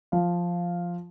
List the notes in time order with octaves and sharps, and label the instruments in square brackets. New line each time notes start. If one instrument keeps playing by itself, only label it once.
[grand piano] F3 F4